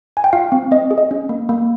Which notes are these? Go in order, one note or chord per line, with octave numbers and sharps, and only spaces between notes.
G#5
G5
F4 F5
C4
C4 D#5
G#4
D#5
C#4
A#3
A#3